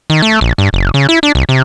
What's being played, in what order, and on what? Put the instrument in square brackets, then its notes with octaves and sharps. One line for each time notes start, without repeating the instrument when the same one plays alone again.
[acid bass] D#3
A3
A#1
G2
F#1
C#3
E4
D4
C2
C3